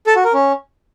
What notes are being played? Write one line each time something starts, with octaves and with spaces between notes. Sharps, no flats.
A4
F#4
A#4
C#4